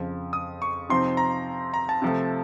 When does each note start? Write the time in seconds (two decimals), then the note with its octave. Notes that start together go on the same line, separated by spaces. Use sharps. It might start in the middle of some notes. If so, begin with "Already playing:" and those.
Already playing: F2 C#3 F3
0.33 D#6
0.62 C#6
0.89 C3 F3 C4 D#4 C6
1.17 A#5
1.74 A#5
1.89 A5
2.02 C3 F3 A3